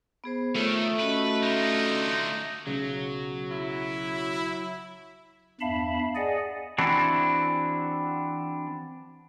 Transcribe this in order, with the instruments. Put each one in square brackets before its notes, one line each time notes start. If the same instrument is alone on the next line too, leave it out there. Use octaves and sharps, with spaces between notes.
[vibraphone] B3 G#4 C5
[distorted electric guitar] D#3 [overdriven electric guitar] A3 [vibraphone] F4 C#5
[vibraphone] C#4 F#4 D#5 [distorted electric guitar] B4
[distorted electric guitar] D3 F4 [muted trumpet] D#4
[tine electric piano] B1 C#3 [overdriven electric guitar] F#3
[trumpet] E4
[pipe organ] E2 G2 E5 F5 A5 B5
G#4 D5 D#5 F#5 G#5
[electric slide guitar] E3 C4 D4 E4 F#4